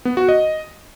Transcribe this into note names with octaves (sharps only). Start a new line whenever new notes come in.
B3
F#4
D#5